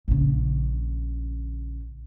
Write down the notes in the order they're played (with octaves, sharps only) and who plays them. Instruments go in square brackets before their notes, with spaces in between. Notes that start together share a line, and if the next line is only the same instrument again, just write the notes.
[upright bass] A#1 C#3